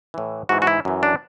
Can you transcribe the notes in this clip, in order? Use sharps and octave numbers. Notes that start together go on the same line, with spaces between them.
A2 E3
G#2 E3 F#4
F#4
E4
F#2 E3
D4